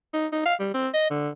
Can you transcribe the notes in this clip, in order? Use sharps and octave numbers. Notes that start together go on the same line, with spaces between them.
D#4
D#4
F5
G3
C4
D#5
D3